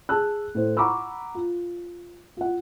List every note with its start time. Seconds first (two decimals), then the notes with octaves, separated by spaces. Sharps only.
0.09 G#4 A5 E6 F#6
0.55 A2 C5
0.77 F#5 A#5 B5 C#6 D6 E6
1.35 F4
2.37 F4 F#5